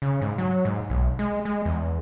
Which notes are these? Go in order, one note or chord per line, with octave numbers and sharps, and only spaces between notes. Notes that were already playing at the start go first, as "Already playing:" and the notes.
C#3
G#2
F#3
G#2
B1
G#3
G#3
E2